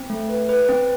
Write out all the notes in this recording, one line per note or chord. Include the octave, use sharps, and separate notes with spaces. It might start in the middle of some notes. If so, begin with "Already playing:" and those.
Already playing: C4
A3
B4
B4
C4